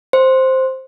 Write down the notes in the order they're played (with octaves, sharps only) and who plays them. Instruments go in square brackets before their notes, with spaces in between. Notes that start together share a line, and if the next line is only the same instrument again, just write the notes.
[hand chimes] C5